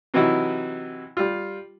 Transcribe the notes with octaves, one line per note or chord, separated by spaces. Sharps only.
C3 E3 F#3 D#4 E4 F#4
G3 F4